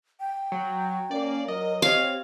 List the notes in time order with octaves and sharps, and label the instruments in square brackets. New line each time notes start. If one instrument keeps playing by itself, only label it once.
[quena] G5
[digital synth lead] F#3
[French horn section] A#3 C#4 [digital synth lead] D5
[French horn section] F#3 [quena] A#4 [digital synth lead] D#5
[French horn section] C4 G4 [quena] C#5 [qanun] F5